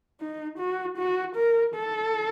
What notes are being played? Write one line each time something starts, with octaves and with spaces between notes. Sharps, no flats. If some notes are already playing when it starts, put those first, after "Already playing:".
D#4
F#4
F#4
A#4
A4